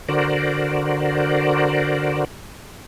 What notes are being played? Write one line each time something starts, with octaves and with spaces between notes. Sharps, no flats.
D3 F#4 A#4 C5 D5